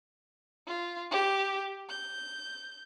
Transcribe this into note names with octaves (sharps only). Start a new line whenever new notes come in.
F4
G4
G6